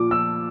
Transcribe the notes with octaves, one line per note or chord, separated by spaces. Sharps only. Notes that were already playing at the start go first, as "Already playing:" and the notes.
Already playing: A#2 F3 D6
F3 E6